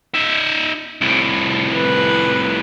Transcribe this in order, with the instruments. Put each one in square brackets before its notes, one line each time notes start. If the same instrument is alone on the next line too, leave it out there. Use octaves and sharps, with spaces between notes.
[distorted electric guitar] D#4 E5
C2 A2
[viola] B4